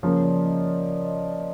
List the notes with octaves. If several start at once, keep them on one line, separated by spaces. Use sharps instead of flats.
C#3 F3 A#3 C#5
D5
D#5
D5
D5
D#5
D5